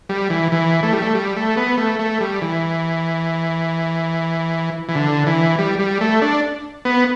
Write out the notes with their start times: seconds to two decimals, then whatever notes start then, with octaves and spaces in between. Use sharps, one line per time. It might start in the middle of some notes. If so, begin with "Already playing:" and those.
0.09 G3
0.30 E3
0.52 E3
0.83 A3
0.93 G3
1.02 A3
1.15 G3
1.36 A3
1.57 B3
1.78 A3
1.99 A3
2.21 G3
2.42 E3
4.89 E3
4.95 D3
5.27 E3
5.59 G3
5.79 G3
6.01 A3
6.22 D4
6.85 B3